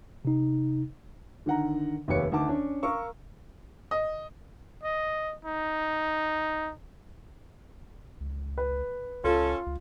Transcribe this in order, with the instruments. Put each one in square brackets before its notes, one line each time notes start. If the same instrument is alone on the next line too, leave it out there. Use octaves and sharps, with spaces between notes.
[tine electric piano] C3 D#4
[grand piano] D3 D#3 F#5 A#5
F1 D#2 G4 B4 C#5 C#7
D2 D#3 F#5 A5 D6
C#4 D4
A#4 F5 C#6 E6
[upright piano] D#5
[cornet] D#5
D#4
[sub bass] C#2
[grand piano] B4
[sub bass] C#2 [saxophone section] C#4 A4 [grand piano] F4
[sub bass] C#2